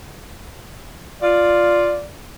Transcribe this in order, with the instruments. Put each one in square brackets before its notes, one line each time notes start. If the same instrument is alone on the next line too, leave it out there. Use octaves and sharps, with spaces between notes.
[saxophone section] F4 [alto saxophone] D5